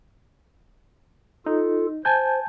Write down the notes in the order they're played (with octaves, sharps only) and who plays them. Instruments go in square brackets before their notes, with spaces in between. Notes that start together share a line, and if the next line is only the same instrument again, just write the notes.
[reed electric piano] D#4 [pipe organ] F4 A4
[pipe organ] C5 [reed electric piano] G#5 A5 G6